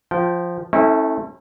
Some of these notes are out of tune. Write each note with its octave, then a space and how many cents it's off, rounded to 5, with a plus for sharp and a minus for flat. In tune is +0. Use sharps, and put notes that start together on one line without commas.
F3 +0 G5 -20
A3 +0 C#4 -40 E4 -35